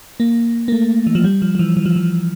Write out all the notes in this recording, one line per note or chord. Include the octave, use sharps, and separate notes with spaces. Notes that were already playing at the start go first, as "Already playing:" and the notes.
A#3
A#3
A3
E3
F3
G3
F3
F3
E3
E3
F3
E3